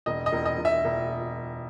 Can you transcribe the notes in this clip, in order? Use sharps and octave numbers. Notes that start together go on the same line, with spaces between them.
E1 D#5
D#5
E1
D#5
E1
E5
E1